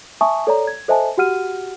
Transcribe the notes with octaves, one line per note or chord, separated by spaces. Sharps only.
E5 G#5 A5 C#6 D#6
A4 C#5 D5 A#5
G#6
A4 C5 D#5 E5 G#5 A5
F#4 G4 F#5 F6 D#7